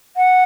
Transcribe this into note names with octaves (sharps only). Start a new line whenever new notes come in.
F#5